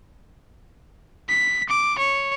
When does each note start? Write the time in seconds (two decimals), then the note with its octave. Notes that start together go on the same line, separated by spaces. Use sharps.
1.29 B6
1.69 D6
1.98 C#5